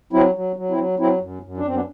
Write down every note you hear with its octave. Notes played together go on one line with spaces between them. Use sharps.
F#3 C4 E4
F#3
F#3
C4 E4
F#3
F#3 C4 E4
F#2
F#2
D4
F#2 C4
B3 D4